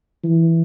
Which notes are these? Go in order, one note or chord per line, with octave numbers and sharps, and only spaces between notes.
E3